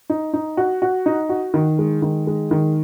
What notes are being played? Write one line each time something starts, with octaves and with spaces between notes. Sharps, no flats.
D#4
D#4
F#4
F#4
D#4
F#4
D#3
G#3
D#3
G#3
D#3